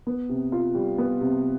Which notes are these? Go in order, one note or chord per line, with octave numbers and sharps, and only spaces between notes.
B3
C3
F4
G3
B3
C3